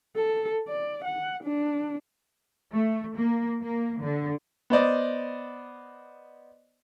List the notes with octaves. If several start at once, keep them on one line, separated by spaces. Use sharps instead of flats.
A4
D5
F#5
D4
A3
A#3
A#3
D3
B3 C5 D5 D#5